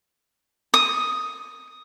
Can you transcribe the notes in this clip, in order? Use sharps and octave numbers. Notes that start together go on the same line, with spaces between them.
D#6